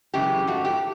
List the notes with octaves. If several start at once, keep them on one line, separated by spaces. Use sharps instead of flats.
F#2 C#3 E3 G#3 G4
G#2 F3 A3 F#4
G4